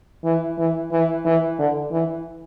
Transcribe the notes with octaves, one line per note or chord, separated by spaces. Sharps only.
E3
E3
E3
E3
D3
E3